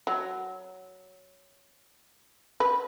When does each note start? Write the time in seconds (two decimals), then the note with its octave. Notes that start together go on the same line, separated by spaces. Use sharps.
0.07 F#3
2.60 B4